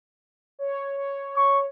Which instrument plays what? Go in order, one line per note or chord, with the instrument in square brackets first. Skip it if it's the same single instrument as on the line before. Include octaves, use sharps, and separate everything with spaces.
[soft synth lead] C#5
C#5
[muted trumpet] C#6